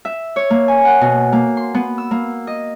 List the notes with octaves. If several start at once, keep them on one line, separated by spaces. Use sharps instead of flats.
E5
C#5
A#3
G#5
F#5
B2
A#3
C6
B3
E6
A#3
D#5